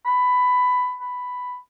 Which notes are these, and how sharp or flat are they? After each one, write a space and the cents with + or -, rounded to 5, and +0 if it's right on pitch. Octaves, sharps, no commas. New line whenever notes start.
B5 +15
B5 +5